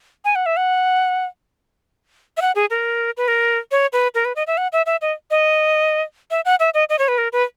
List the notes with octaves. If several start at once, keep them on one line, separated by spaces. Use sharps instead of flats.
G#5
F#5
E5
F#5
E5
F#5
G#4
A#4
B4
A#4
C#5
B4
A#4
B4
D#5
E5
F#5
E5
E5
D#5
D#5
E5
F#5
E5
D#5
D#5
C#5
B4
A#4
B4